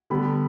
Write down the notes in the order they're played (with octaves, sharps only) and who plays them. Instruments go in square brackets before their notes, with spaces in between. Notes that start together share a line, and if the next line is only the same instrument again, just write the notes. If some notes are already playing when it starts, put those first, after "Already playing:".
[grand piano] D3 G3 B3 B5